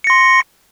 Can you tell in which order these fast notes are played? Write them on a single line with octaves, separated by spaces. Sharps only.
C#7 A#6 C6